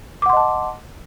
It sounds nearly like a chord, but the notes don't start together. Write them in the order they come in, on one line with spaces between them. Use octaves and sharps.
D6 F#5 C6 D#5 A5